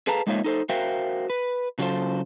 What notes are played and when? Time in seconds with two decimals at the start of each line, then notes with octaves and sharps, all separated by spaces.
0.07 G#4 A4 B4 F5 A5 A#5
0.27 G#3 A#3 D#4 F4 C#5 E5
0.44 D#4 A4 C5
0.69 F#4 A#4 C5 E5 F5 G5
1.30 B4
1.78 C#3 F#3 F4 G4 A4 C5